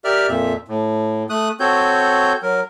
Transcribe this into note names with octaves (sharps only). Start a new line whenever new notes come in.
G4 A#4 D5 E5 F6
F2 A#2 E5
A2
A3 D#6 F#6
C4 F#4 A4 C#5 G6
F#3 A#4